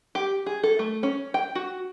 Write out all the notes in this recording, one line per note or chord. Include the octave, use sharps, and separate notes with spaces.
G4
G#4
A4
A3
C#4
G5
F#4